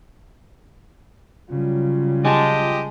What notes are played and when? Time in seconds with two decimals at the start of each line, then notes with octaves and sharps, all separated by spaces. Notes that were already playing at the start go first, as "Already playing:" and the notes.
1.50 C#3 F#3 G3 F4
2.25 G#3 G4 D#5 A5